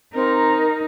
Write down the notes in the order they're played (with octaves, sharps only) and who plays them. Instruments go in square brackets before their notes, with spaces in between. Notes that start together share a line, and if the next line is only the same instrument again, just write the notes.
[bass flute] C4 [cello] D#4 [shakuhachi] A#4